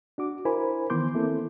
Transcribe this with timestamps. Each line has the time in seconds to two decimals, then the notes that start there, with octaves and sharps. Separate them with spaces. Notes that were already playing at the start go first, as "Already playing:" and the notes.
0.18 D4 F#4 D6
0.45 E4 A#4 C5 G#5 B5
0.90 D#3 E3 B3 C6 D6 G6
1.14 A#3 C4 E4 A4